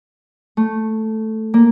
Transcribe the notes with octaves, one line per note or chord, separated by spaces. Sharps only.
A3
A#3